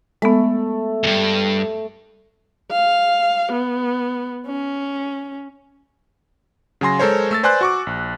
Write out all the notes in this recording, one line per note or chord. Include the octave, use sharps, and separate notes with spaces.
G#3 A3 B3
E2 G2
F5
B3
C#4
C#3 F#3 G#5 C6 A#6
G#3 A4 A#4 C5 C#5
A3 E6 A6
B4 C5 D5 G#5 C6 F#6
F#4 C#6 D6
A#1